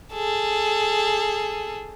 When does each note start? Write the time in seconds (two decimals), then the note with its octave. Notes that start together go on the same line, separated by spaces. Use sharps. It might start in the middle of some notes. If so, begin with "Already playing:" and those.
0.13 G#4 A4